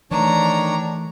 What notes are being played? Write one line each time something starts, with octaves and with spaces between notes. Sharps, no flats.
D#3 E3 A3 D4 C#5 A#5